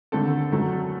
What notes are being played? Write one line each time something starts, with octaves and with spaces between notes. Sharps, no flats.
D#2 D3 A3 C4 A4
F#2 F#3 A3 C4